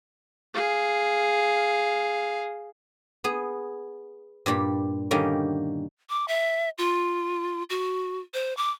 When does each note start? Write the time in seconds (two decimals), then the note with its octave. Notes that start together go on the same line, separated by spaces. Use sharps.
0.54 G#4 F5
3.24 B3 G#4
4.46 G2 A#2 G3 B5
5.11 D3 D#3 G3 A#3 C#4
6.10 D6
6.28 E5
6.78 F4
7.70 F#4
8.34 C5
8.57 D6